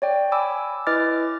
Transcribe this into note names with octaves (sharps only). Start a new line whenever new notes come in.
C#5 D5 G5
G#5 B5 D6 E6
E4 B4 D#5 D6 F6 A6